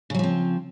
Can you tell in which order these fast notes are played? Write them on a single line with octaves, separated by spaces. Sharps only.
C#3 F#3 F3 C4